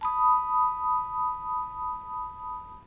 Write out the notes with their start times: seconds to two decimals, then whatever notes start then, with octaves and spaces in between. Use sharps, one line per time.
0.01 A5 B5 D#6